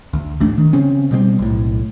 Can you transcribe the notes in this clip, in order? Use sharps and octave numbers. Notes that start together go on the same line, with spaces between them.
D2
A1 A3 D4
D#3
C#3 C4 C#4
B2 G3 A#3 C4
B1 A2